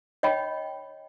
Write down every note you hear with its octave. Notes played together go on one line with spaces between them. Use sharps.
C#5 D#5 G5 B5